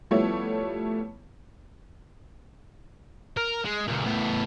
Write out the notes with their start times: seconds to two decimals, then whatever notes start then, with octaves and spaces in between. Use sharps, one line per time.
0.11 F3 G3 A3 B3 E4 C#5
3.37 A#4
3.65 G#3
3.87 C#2 A#2
4.06 A2 B3